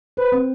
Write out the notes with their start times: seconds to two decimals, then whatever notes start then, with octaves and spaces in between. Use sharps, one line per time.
0.17 B4 C5
0.32 C4